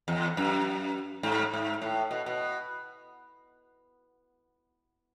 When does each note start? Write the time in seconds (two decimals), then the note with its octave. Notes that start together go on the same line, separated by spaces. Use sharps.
0.08 E2
0.37 F#2
1.23 G#2
1.53 G#2
1.82 A2
2.11 B2
2.26 B2